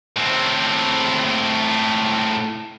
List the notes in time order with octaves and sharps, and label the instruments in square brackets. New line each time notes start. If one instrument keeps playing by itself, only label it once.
[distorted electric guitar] A2 C4